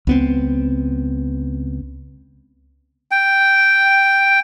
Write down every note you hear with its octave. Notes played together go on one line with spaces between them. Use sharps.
C#2 B3 C4
G5